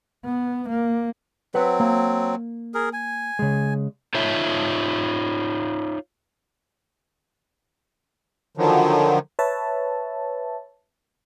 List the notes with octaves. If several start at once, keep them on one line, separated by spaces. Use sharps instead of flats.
B3
A#3
F#3 C4 B4 F#5
A#3
G#4 A#4
G#5
C#3 G#3
D#4 F4 C#5 E5
D3 D#3 F3 F#3
B4 C#5 E5 A5